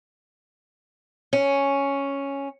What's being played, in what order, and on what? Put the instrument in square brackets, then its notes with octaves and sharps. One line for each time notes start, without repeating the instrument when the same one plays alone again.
[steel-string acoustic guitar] C#4